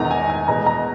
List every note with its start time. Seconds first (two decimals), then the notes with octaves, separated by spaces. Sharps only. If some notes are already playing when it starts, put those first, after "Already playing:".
Already playing: E1 E2 D#3 A#5
0.11 G#5
0.30 G#5
0.48 E2 B2 G#3 A#5
0.66 A#5